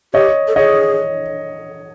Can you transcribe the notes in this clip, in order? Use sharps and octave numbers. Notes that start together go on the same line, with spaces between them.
G4 C#5 D#5
A4
G#4 C#5 D#5